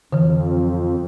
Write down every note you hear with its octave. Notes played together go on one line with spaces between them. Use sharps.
F2 D3 E3